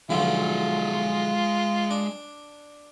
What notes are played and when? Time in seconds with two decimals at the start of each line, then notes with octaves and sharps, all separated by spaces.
0.10 B1 D3 F3 G#3 F4 E5
1.91 D4